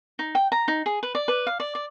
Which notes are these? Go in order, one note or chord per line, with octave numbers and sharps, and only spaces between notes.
D#4
G5
A#5
D#4
G#4
B4
D5
B4
F5
D5
D5